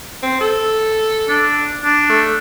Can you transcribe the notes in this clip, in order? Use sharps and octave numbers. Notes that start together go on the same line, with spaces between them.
C4
A4
D4
D4
A3